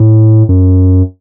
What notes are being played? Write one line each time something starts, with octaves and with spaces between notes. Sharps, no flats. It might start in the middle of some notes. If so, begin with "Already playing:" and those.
Already playing: A2
F#2